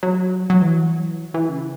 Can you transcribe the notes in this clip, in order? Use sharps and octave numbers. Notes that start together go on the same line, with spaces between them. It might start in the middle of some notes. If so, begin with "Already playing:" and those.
F#3
F#3
E3
E3
C#3